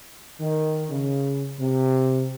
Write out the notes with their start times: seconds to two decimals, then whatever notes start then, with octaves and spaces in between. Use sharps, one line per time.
0.40 D#3
0.91 C#3
1.59 C3